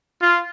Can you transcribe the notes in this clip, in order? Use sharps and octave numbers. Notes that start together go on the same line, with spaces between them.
F4